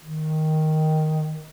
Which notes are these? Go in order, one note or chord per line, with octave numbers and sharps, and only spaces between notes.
D#3